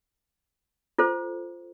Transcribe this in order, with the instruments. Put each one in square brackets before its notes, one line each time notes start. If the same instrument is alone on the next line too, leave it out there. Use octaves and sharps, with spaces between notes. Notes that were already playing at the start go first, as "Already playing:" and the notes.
[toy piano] F4 A4 C5